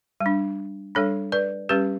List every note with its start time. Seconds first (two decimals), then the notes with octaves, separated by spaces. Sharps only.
0.20 G3
0.26 D4
0.95 G3 D4 A4 C#5
1.32 B4 D5
1.69 G3 C#4 G4 B4